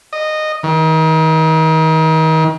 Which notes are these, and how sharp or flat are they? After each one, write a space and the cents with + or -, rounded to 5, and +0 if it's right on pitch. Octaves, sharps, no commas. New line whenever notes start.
D#5 -15
D#3 +35